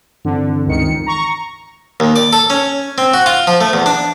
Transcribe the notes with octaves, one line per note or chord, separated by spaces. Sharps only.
G2 D3 E3 C4
C#2 D#3 C#7
A#5 C#6
D#2
D5
A4
C#4
C4
F#4
F4
F3
A3
E2
D4